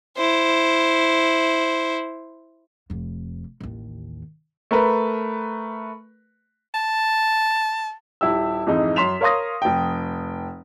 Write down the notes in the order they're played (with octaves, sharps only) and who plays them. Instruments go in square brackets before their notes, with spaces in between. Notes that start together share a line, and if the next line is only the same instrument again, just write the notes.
[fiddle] E4 C5
[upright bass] F1 F2
A1 D#2
[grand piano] A3 A#4 B4
[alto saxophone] A5
[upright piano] D#1 E4 G4 E6
F2 G#2 E3 G#3 D#4
F#2 C6 B6 E7 F7
A#4 C#5 F5 C6 D#6 A#6
F1 G5